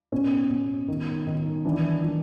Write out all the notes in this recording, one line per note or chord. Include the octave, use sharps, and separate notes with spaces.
B2 C#4
B2
D#3
D#3
E3 D4
E3